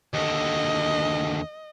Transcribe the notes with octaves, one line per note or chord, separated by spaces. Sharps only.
D#2 D3 D#5